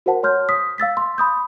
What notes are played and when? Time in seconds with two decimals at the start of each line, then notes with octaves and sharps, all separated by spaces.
0.06 F#4 A#4 C5 F#5 A5
0.23 C#5 C6 F6 G6
0.49 D#6 B6
0.78 F5 E6 A6 B6
0.97 C6
1.18 B5 D#6 G6